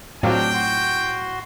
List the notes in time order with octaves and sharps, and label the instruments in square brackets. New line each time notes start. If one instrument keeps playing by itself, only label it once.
[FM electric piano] A2 [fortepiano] F#3 C4 F4 [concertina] D4 [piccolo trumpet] G5
[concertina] F#4 C6